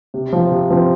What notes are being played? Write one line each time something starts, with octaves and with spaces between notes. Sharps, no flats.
C3
F3 C4
C3
F3 C4